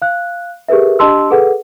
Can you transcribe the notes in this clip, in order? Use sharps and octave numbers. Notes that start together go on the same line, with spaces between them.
F5 F#6
G4 G#4 A#4 B4 E5
D4 G4 D#5 A5 C6 E6
G#4 A4 B4 F#5